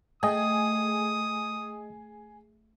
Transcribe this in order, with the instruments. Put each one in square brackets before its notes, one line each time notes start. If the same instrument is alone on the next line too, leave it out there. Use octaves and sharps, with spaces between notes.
[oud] A3 [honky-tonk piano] G#4 [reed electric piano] D#5 G5 [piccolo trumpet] D#6